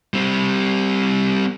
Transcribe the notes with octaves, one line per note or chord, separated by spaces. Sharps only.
G3 C4